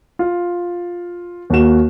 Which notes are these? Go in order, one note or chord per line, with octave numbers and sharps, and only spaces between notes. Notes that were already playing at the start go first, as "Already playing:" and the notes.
F4
D#2 A#3 F#4 E7